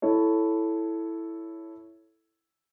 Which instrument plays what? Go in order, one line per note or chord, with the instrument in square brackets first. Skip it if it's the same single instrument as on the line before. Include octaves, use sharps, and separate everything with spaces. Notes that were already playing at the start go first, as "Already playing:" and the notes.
[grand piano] E4 A4 C#5